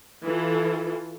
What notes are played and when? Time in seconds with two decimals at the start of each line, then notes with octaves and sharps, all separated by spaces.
0.25 E3 F4 A4